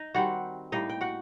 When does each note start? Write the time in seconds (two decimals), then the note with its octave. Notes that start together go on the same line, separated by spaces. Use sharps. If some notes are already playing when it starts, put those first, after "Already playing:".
Already playing: D#4 D#5
0.14 D#3 G3 C4 F#4 F#5
0.72 A2 G3 A#3 D#4 D#5
0.89 G5
1.01 F#4 F#5